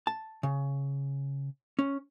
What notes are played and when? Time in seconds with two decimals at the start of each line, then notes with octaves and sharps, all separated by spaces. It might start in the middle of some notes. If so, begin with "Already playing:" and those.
0.07 A5
0.43 C#3
1.79 C#4